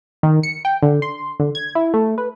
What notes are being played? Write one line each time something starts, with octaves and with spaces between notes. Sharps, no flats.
D#3
C#7
G5
D3
C6
D3
G#6
E4
A3
B4